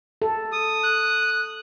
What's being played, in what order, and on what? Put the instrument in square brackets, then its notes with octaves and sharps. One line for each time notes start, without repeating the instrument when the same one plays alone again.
[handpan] A4
[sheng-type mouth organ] D#6
[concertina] F#6